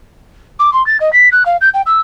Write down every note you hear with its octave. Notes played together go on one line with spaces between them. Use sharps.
D6
C6
A6
D#5
B6
F#6
F5
G6
G5
E6